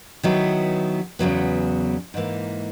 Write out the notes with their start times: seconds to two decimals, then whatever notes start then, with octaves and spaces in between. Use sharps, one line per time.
0.23 D#3 F#3 B3 E4
1.19 E2 C#3 F#3 B3
2.14 G#2 E3 A#3